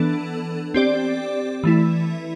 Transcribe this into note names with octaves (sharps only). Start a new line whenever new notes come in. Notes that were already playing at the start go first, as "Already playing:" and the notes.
Already playing: E3 B3 D4 A4
C4 G4 D5
E3 A3 E4